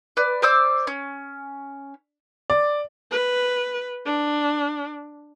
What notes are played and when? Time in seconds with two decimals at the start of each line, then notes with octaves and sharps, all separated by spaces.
0.17 B4 D5
0.42 C5 D5 D6 E6
0.87 C#4
2.50 D5
3.11 B4
4.06 D4